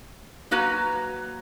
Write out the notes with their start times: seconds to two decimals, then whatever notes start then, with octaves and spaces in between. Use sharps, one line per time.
0.51 F#3 A#3 F#4 B4 A#5